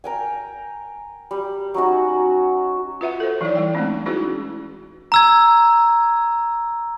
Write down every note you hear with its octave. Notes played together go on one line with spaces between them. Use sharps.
A#4 G5 G#5
G3
F#3 C#4 D#4 F#4
F4 B4 E5 F#5
A4 C5
E3 F#3 D#4 E4 C#5 D5
G3 G5
G#3 A3 C4 C#4 D#4
C#4 D#4 E4 F#4 G#4 B4
A#5 E6 G#6